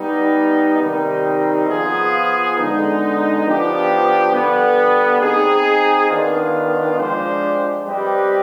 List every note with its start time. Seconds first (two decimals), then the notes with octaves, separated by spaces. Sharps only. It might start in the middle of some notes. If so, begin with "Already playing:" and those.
Already playing: G3 B3 D#4
0.81 C3 D#3 G3 C4 D#4
1.70 F3 B3 F4 G#4
2.57 D3 G#3 B3 D#4
3.46 F3 B3 D4 G4
4.33 D3 G3 B3
5.22 C4 D#4 G#4
6.10 D#3 B3 D4 F4
6.97 F3 G#3 D4 G4 C5
7.86 G3 C4 G4 B4 D#5